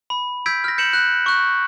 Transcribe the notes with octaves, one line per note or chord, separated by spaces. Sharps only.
B5
E6 G6 G#6 B6 D7
F6 A#6
G6 C#7 E7 F#7
F#6
C#6 F#6